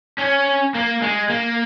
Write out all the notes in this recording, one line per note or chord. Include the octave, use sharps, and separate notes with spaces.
C#4
A#3
G#3
A#3